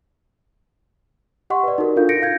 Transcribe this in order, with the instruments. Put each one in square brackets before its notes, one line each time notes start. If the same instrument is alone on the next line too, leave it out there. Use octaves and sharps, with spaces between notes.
[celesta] G4 D#5 F#5 C6 C#6
B4 D5
D#4 F#4 A#4
D4 F4 A4 A#4 F5 G6
A#6 C#7 D7
F5 G6 G#6 A#6